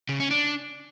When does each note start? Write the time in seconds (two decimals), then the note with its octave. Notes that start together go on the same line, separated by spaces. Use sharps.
0.09 C#3
0.20 C#4
0.31 D4